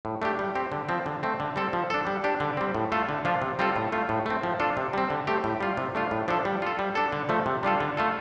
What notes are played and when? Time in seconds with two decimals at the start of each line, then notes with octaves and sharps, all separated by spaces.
0.05 A2
0.22 A3 D4 G4
0.39 G3
0.55 C4 G4
0.72 D3
0.89 F3 C4
1.06 D3
1.23 A3 C4
1.40 D3
1.56 G3 C4 A4
1.73 F3
1.90 D4 A4
2.07 G3
2.24 D4 G4
2.40 D3
2.57 G3 C4
2.75 A2
2.92 A3 F4 A4
3.09 D3
3.25 F3 D4 F4
3.42 C3
3.59 G3 C4 F4 A4
3.76 A2
3.92 A3 F4
4.09 A2
4.26 A3 C4
4.43 F3
4.60 D4 F4 A4
4.77 C3
4.93 G3 C4
5.10 D3
5.27 A3 C4 G4
5.44 A2
5.60 G3 F4
5.77 C3
5.95 A3 D4 F4
6.11 A2
6.28 F3 D4 A4
6.45 G3
6.62 F4 A4
6.79 G3
6.95 D4 A4
7.12 D3
7.29 F3 A3
7.46 C3
7.63 G3 D4 F4 A4
7.80 D3
7.97 A3 F4 A4